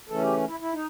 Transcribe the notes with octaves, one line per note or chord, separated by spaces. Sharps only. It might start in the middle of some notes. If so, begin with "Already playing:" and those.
C#3 E3 A3 C#4 A4
G4
E4
E4
D#4